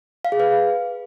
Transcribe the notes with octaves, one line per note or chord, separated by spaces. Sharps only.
F5
G#4
B4